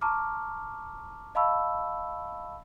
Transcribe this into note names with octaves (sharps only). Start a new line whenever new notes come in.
A5 A#5 C#6 D6 F6
D#5 F5 A5 B5 C#6 E6